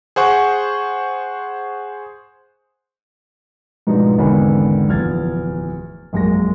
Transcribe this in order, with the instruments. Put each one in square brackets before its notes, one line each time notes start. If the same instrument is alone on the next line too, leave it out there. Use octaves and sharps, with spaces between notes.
[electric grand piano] G#4 C5 F#5 C#6
[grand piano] G#2 B2 F3 G#3 D4 D#4
G#1 E2 G#2 D3 D#3 B5
D1 E2 F3 F6 G#6 A6
A#1 F#2 G#3 A#3 A#6